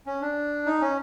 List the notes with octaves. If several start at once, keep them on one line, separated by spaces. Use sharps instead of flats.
C#4
D4
D#4
C#4